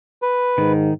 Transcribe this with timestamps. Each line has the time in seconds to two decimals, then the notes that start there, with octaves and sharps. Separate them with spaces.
0.22 B4
0.58 G#2 D#3